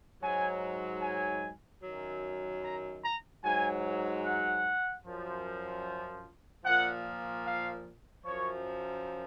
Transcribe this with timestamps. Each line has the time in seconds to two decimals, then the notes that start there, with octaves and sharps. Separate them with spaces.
0.23 G#2 F#3 G#5
1.02 G#5
1.83 F#2 D#3 F#3
2.63 A#5
3.04 A#5
3.44 G#2 F#3 G#5
4.24 F#5
5.04 F#2 F3
6.64 A#2 F3 F#5
7.45 F5
8.25 F#2 F3 C#5